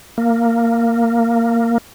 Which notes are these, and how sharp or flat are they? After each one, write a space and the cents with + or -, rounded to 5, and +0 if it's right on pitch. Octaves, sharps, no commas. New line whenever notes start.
A#3 -10